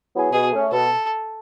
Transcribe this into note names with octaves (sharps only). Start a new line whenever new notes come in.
F#3 B3 E4 G#4
B2 G#4
A3 C#4
B2 A4